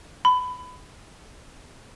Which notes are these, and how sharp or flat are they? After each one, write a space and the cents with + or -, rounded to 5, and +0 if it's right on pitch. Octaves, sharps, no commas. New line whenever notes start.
B5 +20